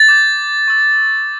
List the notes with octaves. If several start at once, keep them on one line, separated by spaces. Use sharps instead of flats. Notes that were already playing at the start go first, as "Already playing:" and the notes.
Already playing: A6
D6 G6
C#6 E6 G6